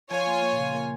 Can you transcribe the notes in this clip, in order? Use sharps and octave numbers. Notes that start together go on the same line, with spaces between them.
F3 F4 C#5 G#5
A#3
A#3
A#2
C#3
A#3